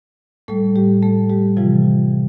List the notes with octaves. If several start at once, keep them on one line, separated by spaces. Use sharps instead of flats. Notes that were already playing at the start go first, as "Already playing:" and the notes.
A2 G3 A3 A4
G3 G4
A3 A4
G3 G4
C3 E3 F3 G3 F4